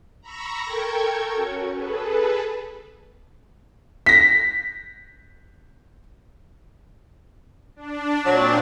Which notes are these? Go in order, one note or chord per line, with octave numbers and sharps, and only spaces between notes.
A#5 B5 C#6 E6 A#6
A4 A#4 G5 C#6 G#6
C#4 F#4
G#4 A4 B4
A#6 B6
D4
A#2 F#3 C4 D4